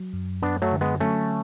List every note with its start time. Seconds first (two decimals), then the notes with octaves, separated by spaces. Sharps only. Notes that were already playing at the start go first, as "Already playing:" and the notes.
Already playing: F#3
0.13 F#2
0.42 F#2 B3 D4
0.62 F#3 A3
0.72 D3
0.81 G#3 B3
1.00 F#3 A3 C#4